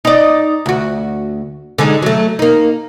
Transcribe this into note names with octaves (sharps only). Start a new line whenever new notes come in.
D#4 D5
D2 F#4
D3 G#3 D#4
F#3 A3
A#3 D#4